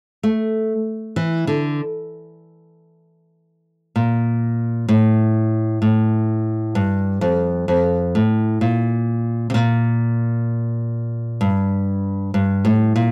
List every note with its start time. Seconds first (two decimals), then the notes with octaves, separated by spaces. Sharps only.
0.23 A3
1.16 E3
1.47 D3
3.96 A#2
4.88 A2
5.82 A2
6.75 G2
7.21 F2
7.68 F2
8.15 A2
8.61 A#2
9.50 C3
9.54 A#2
11.41 G2
12.34 G2
12.65 A2
12.96 A#2